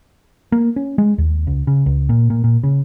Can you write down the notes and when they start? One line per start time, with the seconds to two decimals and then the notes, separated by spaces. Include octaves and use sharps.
0.52 A#3
0.76 C#4
0.98 G#3
1.18 D#2
1.47 C#2
1.67 C#3
1.86 C#2
2.09 A#2
2.30 A#2
2.44 A#2
2.63 C#3